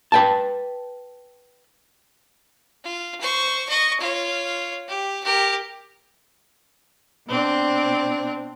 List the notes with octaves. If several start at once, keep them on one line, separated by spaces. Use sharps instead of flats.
B4 G5 A5
F4
C5 C#6
D#5 C#6
F4 C#5
G4
G4 A#4
B2 C4 D4